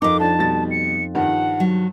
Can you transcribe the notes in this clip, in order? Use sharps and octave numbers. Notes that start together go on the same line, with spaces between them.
F2 D#4 A#4 D#5 D6
F3 D4 A5
B2 G3 A6
C#7
G2 D#3 F3 F#5
F#3